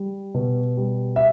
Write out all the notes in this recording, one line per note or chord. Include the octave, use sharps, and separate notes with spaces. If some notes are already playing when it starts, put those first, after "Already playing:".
Already playing: G3
B2
G3
E5